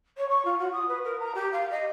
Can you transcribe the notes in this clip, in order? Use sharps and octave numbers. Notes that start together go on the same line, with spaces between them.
C#5
C#6
F4
F#4
D#6
B4
A#4
A#5
G4
F5
D#5